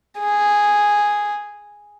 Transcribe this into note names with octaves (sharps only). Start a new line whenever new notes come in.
G#4